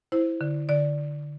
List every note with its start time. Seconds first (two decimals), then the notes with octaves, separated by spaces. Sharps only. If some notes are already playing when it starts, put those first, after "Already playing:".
0.12 E4 C5
0.41 D3
0.69 D3 D5